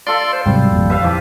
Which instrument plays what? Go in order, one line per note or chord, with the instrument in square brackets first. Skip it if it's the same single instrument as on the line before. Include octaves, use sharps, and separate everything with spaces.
[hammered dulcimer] F4 A4 E5 [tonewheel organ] D5 C6
[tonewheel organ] C5
[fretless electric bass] G#2 C3 F#3 [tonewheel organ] G3
[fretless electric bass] G#1 F2 A#2
[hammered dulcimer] B4 E5 F5
[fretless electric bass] F2 E3 [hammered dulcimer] F3 G4 D6